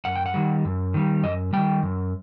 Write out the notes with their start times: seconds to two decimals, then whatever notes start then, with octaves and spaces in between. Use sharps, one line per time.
0.05 F#2 F#5
0.15 G5
0.26 F#5
0.34 D#3 G3
0.65 F#2
0.94 D#3 G3
1.23 F#2 D#5
1.53 D#3 G3 G5
1.83 F#2